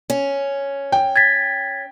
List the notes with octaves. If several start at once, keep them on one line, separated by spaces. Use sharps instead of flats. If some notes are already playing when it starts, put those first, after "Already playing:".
C#4
G5
G#6 A6 B6